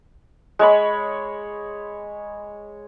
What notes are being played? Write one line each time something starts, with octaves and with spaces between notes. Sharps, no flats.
G#3 C#5 B5